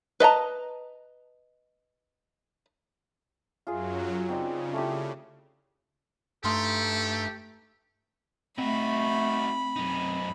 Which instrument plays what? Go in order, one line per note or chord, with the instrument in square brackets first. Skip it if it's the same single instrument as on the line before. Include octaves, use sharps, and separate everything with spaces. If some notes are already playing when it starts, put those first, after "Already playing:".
[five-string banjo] B4 D#5 A5 A#5
[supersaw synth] F#2 F#3 [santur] F4 G#4 E5
[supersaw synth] C#3 [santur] C4 D#4 D5
[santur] A3 E4 G4
[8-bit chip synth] G2 A3 [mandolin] D#4 C6 F6 [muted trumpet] G4 [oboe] A4
[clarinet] A3 [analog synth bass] C4 [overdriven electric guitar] D#4 F#4 [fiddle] B5
[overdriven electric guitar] F#2 D#4